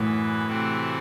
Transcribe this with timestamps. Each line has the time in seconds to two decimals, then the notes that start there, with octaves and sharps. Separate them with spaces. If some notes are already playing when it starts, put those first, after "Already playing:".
Already playing: F#2 A2 E3 B3
0.46 C3 E3 A3 C4 F#4